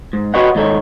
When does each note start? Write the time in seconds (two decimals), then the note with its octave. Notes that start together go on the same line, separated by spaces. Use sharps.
0.13 G#2
0.34 F#4 G4 B4 C#5 D#5 F#5
0.55 D#2 G#2 D#4 A4 C#5